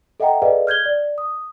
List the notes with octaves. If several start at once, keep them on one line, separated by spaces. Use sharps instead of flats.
A4 D#5 E5 F#5 G5 A#5
G#4 A4 B4 D5 D#5 F5
F6 G6 G#6 G7
D5
D#6